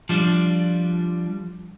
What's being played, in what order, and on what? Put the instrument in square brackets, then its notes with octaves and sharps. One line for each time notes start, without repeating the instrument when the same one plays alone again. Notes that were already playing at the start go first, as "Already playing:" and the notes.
[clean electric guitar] F3 G3 D4